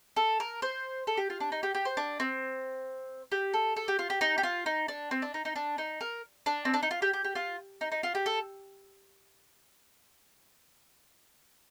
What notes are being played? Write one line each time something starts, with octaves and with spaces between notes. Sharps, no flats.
A4
A#4
C5
A4
G4
F4
D4
D#4
G4
G4
C5
D4
C4
G4
A4
A4
G4
F4
G4
D#4
G4
F4
D#4
D4
C4
D4
D#4
D#4
D4
D#4
A#4
D4
C4
D4
D#4
F4
G4
G4
G4
F4
D#4
D#4
F4
G4
A4